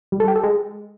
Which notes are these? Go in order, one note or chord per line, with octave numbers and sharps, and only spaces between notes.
G3
A4
G4
A4
G#3